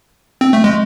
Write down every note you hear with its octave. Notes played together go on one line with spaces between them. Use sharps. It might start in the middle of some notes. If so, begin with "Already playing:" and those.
C4
A3
G#3